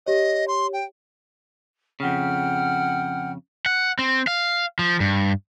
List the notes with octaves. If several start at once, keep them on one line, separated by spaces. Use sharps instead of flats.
G4 C#5 D#5
C6
G5
F2 C#3 F#5 G5 F6
F#5
C4
F5
F3
G2